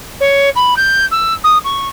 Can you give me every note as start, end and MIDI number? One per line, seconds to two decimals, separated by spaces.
0.20 0.49 73
0.56 0.74 83
0.76 1.05 91
1.11 1.34 88
1.44 1.58 87
1.64 1.88 85